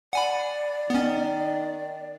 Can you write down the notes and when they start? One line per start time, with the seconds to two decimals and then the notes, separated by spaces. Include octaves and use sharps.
0.13 D5 F#5 G#5 B5
0.90 D#3 B3 C#4